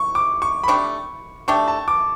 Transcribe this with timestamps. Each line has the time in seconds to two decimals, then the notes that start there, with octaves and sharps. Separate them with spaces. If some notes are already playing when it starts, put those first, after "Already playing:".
Already playing: C#6
0.15 D6
0.42 C#6
0.63 B5
0.68 A3 D4 G4 C#6
1.48 A3 D4 G4 C#6
1.68 A5
1.88 D6